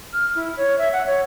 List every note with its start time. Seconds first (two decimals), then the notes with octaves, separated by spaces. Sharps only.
0.13 F6
0.35 E4
0.57 C#5
0.78 E5
0.93 F#5
1.06 C#5